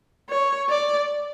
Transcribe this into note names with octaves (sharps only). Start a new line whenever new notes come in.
C#5
D5